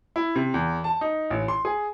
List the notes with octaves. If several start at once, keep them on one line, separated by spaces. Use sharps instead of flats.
E4
C3
E2
A5
D#4
A1
C6
G#4